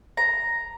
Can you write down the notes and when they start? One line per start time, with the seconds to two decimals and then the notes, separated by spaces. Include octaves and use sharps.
0.17 A#5